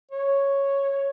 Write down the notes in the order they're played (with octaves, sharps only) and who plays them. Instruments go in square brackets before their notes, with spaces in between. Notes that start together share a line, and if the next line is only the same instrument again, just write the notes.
[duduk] C#5